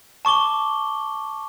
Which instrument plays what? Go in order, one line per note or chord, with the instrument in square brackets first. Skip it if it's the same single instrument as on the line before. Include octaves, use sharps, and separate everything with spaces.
[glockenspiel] A5 C#6 D6 G7